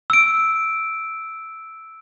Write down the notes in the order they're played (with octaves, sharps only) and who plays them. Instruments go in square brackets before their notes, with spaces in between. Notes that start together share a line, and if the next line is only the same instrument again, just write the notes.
[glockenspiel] E6 D7